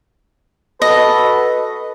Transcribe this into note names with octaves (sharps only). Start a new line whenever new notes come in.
F#4 A4 B4 D#5